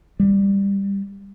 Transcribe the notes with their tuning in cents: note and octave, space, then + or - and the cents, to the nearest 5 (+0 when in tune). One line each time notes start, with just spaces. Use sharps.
G3 +15